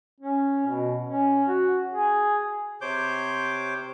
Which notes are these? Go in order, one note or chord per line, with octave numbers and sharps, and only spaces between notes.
C#4
B2
C#4
F#4
G#4
C3 C5 C#5 D6 G6